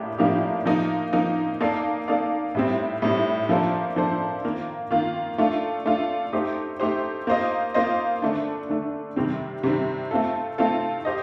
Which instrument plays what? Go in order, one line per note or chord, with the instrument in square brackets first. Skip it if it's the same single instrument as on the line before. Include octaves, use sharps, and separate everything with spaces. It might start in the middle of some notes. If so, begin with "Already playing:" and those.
Already playing: [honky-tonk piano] A2 A#3 D4 G4
A2 F3 A#3 D4 G4
F3 A#3 D#4
F3 A#3 D#4
A#3 D#4 A4 D5 F5
A#3 D#4 A4 D5 F5
A2 G3 C4
A2 G3 C4
F3 A#3 D4 A4 C5
F3 A#3 D4 A4 C5
D#3 A#3 F4
D#3 A#3 F4
A3 D4 F4
A3 D4 F4
A3 D#4 G4 C5
A3 D#4 G4 C5
A#3 F4 C5 D#5
A#3 F4 C5 D#5
D3 A3 D4
D3 A3 D4
C3 D#3 G3 C4
C3 D#3 G3 C4
A3 C4 F4 A4
A3 C4 F4 A4
G4 C5 D#5